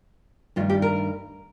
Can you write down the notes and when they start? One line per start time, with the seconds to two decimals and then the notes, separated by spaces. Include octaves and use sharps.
0.56 G2 D#3 A3 D4 F4
0.69 G4
0.82 A#4